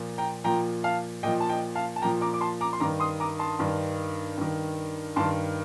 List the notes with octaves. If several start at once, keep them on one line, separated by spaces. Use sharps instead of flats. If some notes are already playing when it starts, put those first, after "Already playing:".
Already playing: A#2 F3
G5 A#5
A#2 F3 G5 A#5
F5 A5
A#2 F3 D#5 G5
A5
D#5 G5
F5 A5
A5
A#2 F3 G5 A#5
A#5 D6
D6
A5 C6
A#5 D6
C6
G2 D#3 A#5 D6
C6 D#6
A#5 D6
A5 C6
G2 D#3
G2 D#3
G2 D#3 A5 C6